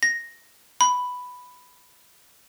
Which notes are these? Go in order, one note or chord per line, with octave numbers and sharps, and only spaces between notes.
A#6
B5